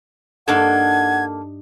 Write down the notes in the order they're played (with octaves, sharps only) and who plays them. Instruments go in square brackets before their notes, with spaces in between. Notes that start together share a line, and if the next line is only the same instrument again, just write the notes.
[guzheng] G2 D4 D#4 [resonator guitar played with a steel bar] A#3 A4 [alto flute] F#5 [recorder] G#6